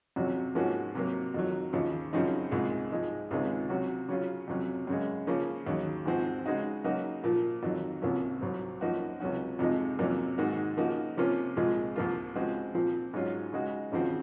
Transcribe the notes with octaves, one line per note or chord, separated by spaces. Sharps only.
F2 C3 F#3 C#4 F#4
G#2 F3 A#3 C#4 F#4
C3 F#3 A#3
F2 D#3 F#3
D#2 C#3 F3
F#2 C#3 F3 C4 D#4
C2 A#2 G#3 D#4
G#2 F3 G#3 D#4
C#2 C3 D#3 G#3
C3 F#3 C#4 F#4
C#3 F#3 C#4 F4
F2 C3 F#3 C#4
F#2 C#3 G#3
C#3 F3 A#3 C#4
D#2 C#3 F#3
G#2 F3 C4 F#4
C#3 G#3 D#4 F#4
C#3 F#3 A#3 D#4 F#4
A#2 F3 A#3
F2 D#3 F#3
C2 C3 F3 A#3 C#4
C2 C3 F#3 C4
F#2 F3 A#3 D#4 F#4
C#2 C3 F#3 C#4 F#4
F2 C3 F3 G#3 D#4
F2 C3 F#3 A#3 C#4
G#2 D#3 A#3 D#4 F#4
C#3 F3 A#3 D#4 F#4
C3 F3 A#3 C#4 F4
C2 A#2 F3 G#3
C2 C3 F3 A#3 F4
C#3 F3 G#3 C4 F#4
A#2 F3 C4
G#2 F#3 C#4 F4
C#3 G#3 D#4 F#4
D#2 C#3 F3 C4 F#4